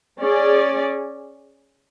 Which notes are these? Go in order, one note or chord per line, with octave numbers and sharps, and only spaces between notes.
C#4 G#4 D5